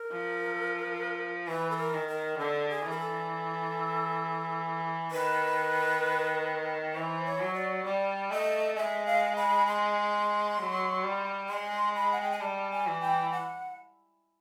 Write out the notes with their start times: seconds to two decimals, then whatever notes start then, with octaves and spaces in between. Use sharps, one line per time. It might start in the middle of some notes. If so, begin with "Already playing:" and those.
Already playing: A#4
0.12 F3
1.48 E3 B4
1.71 A4
1.78 A#4
1.94 D#3
2.08 A#4
2.38 D3 A4
2.69 G#4
2.85 E3
2.90 A#4
2.99 A4
5.11 D#3 B4
6.94 E3 C5
7.25 C#5
7.40 F#3
7.54 D5
7.84 G3 D5
8.30 A3 D#5
8.76 G#3 E5
9.06 F5
9.36 B5
9.67 C6
10.58 F#3
11.03 G3
11.49 G#3 C6
11.95 B5
12.12 F#5
12.22 G5
12.31 G#5
12.40 G3 A5
12.71 G#5
12.86 E3
13.01 G5
13.32 F#5